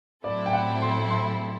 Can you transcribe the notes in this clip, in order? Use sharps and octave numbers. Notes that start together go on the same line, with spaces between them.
A2 F#3 C4 E4 A4 D5
G5
F#5
C6
C6